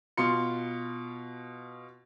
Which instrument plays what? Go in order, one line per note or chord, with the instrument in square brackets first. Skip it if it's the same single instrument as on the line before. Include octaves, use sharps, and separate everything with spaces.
[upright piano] B2 F4 C6 C#7